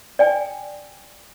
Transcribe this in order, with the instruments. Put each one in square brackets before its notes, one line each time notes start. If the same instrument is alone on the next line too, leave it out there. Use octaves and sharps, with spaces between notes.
[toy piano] D5 G5 G#5